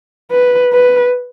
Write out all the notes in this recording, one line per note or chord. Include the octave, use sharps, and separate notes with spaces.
B4
B4